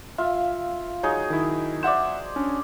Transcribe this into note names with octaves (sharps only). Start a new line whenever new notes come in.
F4 E5 F5
F#3 D#4 G#4 C#5
D#3 E4
C5 D5 E5 F#5 E7
C#4 D4